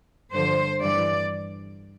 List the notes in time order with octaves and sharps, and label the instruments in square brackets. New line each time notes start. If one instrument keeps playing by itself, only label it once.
[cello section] G2 D3 F3 C5
G2 E3 D5